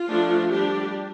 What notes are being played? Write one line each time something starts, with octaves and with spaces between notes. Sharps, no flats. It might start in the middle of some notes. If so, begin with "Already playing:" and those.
Already playing: F4
F3 A3 D4
G3 D4 G4